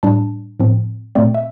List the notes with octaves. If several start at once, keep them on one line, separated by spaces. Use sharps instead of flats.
A2 G3 D4 A5
A2 F3 C4
A#2 A3 C4 D5
E5